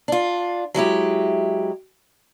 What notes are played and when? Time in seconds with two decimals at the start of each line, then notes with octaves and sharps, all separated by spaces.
0.08 D4 F4
0.74 F#3 G#3 E4 G4